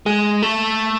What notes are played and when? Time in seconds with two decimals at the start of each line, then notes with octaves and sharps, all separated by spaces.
0.06 G#3
0.43 A3